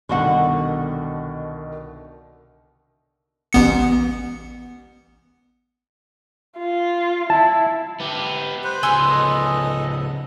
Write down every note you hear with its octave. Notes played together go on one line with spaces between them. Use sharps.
C2 B2 D3 D#3 F#4 F#5
A1 B3 C#7
F4
E4 A5
B3 G4
B4 C5
C#2 B3 G#5 C6 E6
A4 D#5